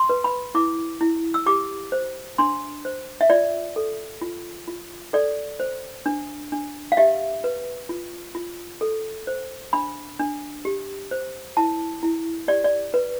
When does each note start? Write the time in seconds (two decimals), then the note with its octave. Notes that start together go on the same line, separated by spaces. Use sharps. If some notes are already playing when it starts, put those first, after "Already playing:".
Already playing: C6
0.09 B4
0.24 B5
0.55 E4 D6
1.01 E4
1.34 E6
1.46 G4 D6
1.92 C5
2.38 D4 C6
2.85 C5
3.21 E5
3.30 F4 D5
3.76 A4
4.21 F4
4.68 F4
5.13 A4 D5
5.60 C5
6.06 D4
6.52 D4
6.92 F5
6.97 G4 E5
7.44 B4
7.89 F4
8.35 F4
8.81 A4
9.27 C5
9.73 D4 B5
10.19 D4
10.65 G4
11.11 C5
11.57 E4 A5
12.03 E4
12.48 G4 D5
12.64 D5
12.94 B4